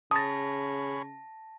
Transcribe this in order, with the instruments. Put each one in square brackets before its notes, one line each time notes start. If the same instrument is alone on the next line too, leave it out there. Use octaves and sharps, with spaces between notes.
[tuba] C#3 [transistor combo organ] G#4 C#5 B5 [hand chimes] A5 A#6 [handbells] D#6 A6